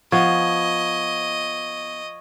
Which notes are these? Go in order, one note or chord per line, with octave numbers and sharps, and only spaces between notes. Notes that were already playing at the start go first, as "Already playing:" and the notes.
F3 B3 D#5 C#6 G#6